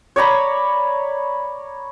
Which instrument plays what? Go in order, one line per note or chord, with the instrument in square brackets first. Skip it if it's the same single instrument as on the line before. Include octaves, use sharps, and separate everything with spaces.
[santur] C#5 D5 A#5 B5